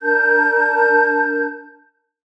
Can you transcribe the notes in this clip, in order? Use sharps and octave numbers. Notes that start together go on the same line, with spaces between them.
D4 A#4 A5 G6